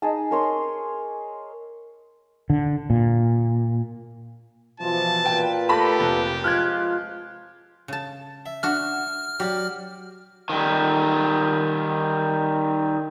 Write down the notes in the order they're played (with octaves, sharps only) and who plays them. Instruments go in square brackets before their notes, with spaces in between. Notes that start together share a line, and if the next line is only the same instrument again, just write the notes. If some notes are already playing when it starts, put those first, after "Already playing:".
[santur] D#4 G#4 A5
A#4 C#5 C6 D6
[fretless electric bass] D3
A#2
[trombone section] B2 E3 [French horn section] F3 [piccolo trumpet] A5
[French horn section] A#2 F4 B4 [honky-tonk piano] G5
[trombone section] A3 A#3 A4 [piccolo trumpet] G4 [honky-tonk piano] A5 B5 A#6
[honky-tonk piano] F1
[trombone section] F3 G#3 F4 [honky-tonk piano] F6 F#6 G#6
[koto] C#3 A5
[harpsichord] E5
[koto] D4 F#4 [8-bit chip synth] F6
[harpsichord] F#3 D5 [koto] G4
[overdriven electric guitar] D#3 G3